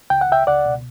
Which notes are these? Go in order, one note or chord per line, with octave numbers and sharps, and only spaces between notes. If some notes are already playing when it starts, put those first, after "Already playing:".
C#2 G5
F#5
C#2 E5 G5
C#2 D5 F#5
B2